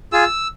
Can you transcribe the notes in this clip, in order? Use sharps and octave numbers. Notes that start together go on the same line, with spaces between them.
F4 G#4 E6